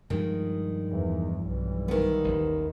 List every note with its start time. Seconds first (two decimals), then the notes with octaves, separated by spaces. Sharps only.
0.10 G2 D#3 F3 G#3
0.90 E2
1.46 B1 E3 G3
1.88 D#3 B3
2.24 A1 D#2